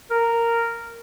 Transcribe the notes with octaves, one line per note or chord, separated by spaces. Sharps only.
A#4